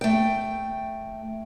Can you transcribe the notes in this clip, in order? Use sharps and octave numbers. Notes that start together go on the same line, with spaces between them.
A3 G5